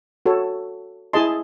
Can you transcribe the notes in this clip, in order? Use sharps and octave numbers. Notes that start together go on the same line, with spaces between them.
F#4 A4 C#5
E4 G#4 D#5 A5 C6